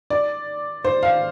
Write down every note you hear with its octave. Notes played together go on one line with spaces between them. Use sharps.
D5
C5
F5